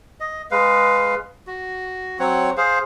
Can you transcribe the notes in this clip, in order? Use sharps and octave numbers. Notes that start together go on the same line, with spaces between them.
D#5
G#3 B4 F5
F#4
F#3 C4 C#5 F#5
G#4 C5 F5